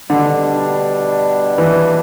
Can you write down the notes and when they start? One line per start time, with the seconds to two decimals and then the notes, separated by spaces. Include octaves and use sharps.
0.09 B2 D3 G3 D4
1.58 E3